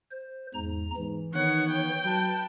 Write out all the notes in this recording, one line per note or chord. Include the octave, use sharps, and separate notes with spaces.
C5
E2 G#2 A#5
G#2 E3
D#3 B3 C#5 F#5
G5
F#3 B4 A5